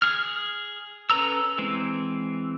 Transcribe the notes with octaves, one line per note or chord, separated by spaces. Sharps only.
G#4 F6
C#4 A4 B4 A#5 E6
E3 G#3 C4